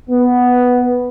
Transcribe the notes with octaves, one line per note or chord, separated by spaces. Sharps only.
B3